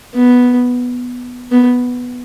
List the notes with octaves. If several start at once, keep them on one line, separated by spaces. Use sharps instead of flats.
B3
B3